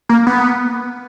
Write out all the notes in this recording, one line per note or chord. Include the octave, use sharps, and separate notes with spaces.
A#3
B3